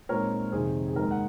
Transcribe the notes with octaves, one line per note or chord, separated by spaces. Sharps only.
A#2 G#3 C4 D#4 A#4 C#5
F2 C3 D#3 G#4 C5
G#4
D#2 D#3 G#3 A#4
F#5